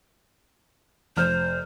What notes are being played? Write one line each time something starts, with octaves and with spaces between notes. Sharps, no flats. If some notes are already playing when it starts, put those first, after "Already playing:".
F1 C5 F6